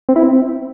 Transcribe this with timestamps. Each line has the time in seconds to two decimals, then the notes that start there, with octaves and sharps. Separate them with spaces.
0.09 C4
0.16 E4
0.23 C4